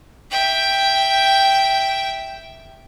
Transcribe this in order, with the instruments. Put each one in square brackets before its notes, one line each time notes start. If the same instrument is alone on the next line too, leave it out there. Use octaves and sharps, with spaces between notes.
[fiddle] E5 G5